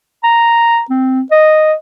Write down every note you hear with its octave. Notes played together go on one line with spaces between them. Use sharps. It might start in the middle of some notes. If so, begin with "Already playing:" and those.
A#5
C4
D#5